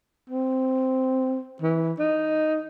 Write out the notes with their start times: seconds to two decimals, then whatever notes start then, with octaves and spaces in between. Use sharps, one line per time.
0.30 C4
1.62 E3
1.99 D#4